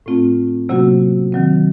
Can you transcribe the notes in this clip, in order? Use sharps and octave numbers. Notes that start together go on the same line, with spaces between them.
A2 A3 C4 F4
C3 F#3 A#3 C#4 F#4
D#3 F#3 C4